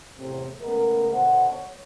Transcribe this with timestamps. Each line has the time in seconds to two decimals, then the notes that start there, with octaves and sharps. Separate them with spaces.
0.17 E2 A2 C3
0.61 C#3 G#3 A3 B3 A#4
1.12 B2 D3 D4 C5 F#5
1.49 C#5